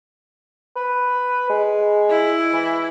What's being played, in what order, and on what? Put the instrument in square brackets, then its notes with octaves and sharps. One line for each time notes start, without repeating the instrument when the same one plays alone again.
[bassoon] B4
G#3
[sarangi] E4
[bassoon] E3